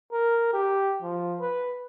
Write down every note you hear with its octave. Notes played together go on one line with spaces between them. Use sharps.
A#4
G4
F3
B4